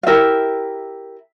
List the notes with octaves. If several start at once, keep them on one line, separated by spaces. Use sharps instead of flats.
F5
E4 G4 A#4 E5